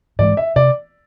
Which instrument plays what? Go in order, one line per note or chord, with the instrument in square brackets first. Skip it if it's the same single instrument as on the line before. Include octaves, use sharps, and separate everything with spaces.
[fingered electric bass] G#2 E3 G#3 [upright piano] D5
[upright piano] E5
[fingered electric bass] C3 [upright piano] D5